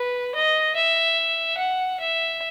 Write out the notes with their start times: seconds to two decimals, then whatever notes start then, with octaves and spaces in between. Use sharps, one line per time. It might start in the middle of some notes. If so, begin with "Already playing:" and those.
Already playing: B4
0.35 D#5
0.76 E5
1.58 F#5
2.00 E5